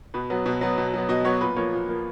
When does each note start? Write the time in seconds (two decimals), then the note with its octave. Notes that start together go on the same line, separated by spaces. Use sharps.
0.14 B2 B4
0.30 F#3 B3
0.46 B2
0.61 F#3 B3
0.78 B2
0.94 F#3 B3
1.09 B2 D#5
1.24 F#3 B3 C#5
1.41 A#2 B4
1.56 F3 A#3 C#5
1.72 A#2
1.88 F3 A#3